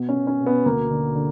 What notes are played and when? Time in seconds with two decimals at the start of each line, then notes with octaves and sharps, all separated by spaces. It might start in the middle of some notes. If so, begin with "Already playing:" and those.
Already playing: B2
0.09 C#4
0.15 B2
0.27 C#4
0.40 B2
0.46 B3
0.65 D2 A#3
0.91 D3
1.15 D3